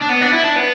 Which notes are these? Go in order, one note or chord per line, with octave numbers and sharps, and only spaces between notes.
D4
B3
D4
E4
D4
B3